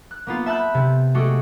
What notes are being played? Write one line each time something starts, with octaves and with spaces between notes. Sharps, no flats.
F#6
A#3 B3 F4
E5 A5 B5 F#6 G6
C3
G#3 A3 F#4 G4